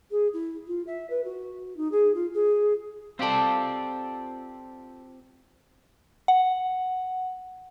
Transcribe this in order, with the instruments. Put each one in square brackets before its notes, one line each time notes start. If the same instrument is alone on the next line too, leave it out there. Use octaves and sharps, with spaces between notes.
[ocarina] G#4
E4
F4
E5
B4
F#4
D#4
G#4
F4
G#4
[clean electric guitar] C4 G4 D5 [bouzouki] F4 A4
[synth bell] F#5